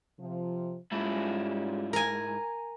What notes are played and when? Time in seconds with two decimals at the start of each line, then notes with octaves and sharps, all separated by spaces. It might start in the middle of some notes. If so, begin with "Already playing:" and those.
0.18 C3 F3
0.92 G#2 G3 C#4 E4 F4
1.93 A#4 G#5